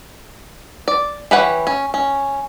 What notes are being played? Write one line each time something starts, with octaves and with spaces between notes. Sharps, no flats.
D5
E3 G4 B4 C#5 F#5
C#4
C#4